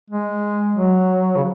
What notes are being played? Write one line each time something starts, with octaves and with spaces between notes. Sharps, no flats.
G#3
F#3
C#3